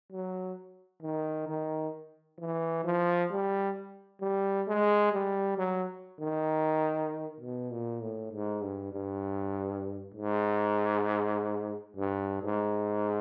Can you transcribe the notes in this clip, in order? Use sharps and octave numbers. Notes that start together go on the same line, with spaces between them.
F#3
D#3
D#3
E3
F3
G3
G3
G#3
G3
F#3
D#3
B2
A#2
A2
G#2
G2
G2
G#2
G2
G#2